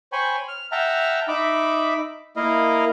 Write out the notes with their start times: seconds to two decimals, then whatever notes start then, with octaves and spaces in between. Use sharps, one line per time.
0.12 C5 C#5 G5 G#5 B5 C#6
0.48 F6
0.72 E5 F#5 G5 A5 A#5 F6
1.28 D#4 E5 B5 D6
2.36 A#3 E4 A#4 D#5 F5